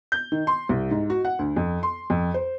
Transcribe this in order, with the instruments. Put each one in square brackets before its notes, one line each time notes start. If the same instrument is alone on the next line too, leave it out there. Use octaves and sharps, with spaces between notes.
[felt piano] G6
D#3
C6
C2
G#2
F#4
F#5
D2
F2
C6
F2
C5